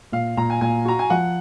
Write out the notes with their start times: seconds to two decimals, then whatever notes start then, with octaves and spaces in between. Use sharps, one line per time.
0.12 A#2 F5
0.37 A#2 A#5
0.50 G#5
0.61 A#2 G#5
0.85 F#4 A#5
0.99 G#5
1.10 F3 F#5